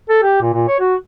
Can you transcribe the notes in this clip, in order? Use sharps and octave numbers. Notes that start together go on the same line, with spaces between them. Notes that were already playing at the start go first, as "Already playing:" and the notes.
A4
G4
A#2
A#2
C#5
F#4